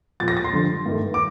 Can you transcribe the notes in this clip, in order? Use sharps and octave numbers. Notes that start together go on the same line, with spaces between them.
A#2 F3 A#3 A6
A#6
A6
C6
F2 D3 G3
G2 D#3 A3
D6